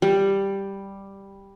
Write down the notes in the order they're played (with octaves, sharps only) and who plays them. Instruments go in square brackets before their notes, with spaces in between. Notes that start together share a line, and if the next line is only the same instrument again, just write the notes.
[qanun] G3